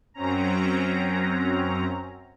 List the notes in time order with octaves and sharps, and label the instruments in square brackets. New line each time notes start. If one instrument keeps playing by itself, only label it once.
[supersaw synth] F#2 F#3 C4 C#4 A#5